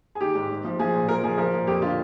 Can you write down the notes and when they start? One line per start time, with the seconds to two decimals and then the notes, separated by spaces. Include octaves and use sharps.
0.15 G#4
0.20 D#3 G4
0.35 G#2
0.50 G#2
0.64 F3
0.79 F3 G#4
0.94 A#2
1.08 F3 A#4
1.24 F3 G#4
1.38 F3 A#4
1.53 A#2
1.67 F2 G4
1.82 D3 F4